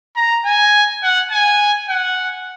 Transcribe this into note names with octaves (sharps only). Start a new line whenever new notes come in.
A#5
G#5
F#5
G#5
F#5